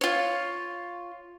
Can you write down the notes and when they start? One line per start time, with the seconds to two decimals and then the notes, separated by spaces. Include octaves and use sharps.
0.01 F4 C#5